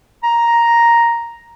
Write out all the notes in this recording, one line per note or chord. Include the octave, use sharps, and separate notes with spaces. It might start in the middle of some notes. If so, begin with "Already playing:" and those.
A#5